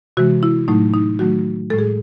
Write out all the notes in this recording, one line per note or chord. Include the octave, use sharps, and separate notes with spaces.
C3 E3 G#3 F#4
E4
A2 F#3 A3 D#4
D#4
D#3 F#3 A3 F#4
A2 G#3 G#4 A4